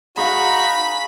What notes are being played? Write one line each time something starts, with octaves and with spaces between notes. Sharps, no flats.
D#4 F#4 G#4 F5 A#5 B5